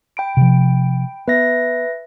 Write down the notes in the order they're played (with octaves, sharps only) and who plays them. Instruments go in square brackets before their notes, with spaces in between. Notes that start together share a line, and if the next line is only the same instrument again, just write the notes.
[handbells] G5 B5 D7
[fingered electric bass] C3 F3
[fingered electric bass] B3 [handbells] B4 E5 A#6